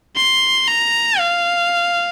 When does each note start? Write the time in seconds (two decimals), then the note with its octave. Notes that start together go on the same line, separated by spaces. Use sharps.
0.16 C6
0.67 A#5
1.19 F5